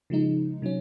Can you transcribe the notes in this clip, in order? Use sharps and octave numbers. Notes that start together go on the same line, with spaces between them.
C#3 F3 G#3 D#4
C3 F#3 C#4